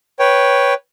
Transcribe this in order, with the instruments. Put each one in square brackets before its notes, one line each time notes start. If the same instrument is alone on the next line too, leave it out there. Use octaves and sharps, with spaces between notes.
[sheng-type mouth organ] B4 C#5 G5